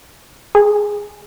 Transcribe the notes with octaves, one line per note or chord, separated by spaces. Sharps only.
G#4